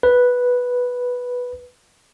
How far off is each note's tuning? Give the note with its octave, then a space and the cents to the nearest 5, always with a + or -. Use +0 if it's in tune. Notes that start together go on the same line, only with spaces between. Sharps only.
B4 -5